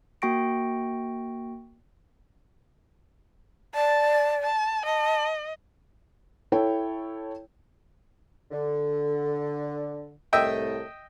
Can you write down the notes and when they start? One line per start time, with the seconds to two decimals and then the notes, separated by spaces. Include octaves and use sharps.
0.22 A#3 F#4 G5 C#6 A#6 D7
3.75 D5 A5
4.43 A5
4.86 D#5 A5
6.52 E4 A4 C#5 G5
8.51 D3
10.33 C2 A2 A3 D#5 E5 G5